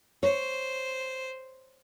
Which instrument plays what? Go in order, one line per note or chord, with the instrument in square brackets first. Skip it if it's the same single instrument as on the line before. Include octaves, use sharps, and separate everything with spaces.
[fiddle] C5 [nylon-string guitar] C#5